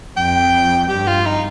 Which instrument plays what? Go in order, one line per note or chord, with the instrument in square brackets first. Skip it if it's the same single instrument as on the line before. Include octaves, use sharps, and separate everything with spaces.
[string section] F2 [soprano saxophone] G5
[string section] G2 [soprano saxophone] G4
[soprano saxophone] F4
D#4